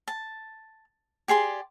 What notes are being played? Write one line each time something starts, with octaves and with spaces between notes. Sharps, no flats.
A5
G4 G#4 D5 C6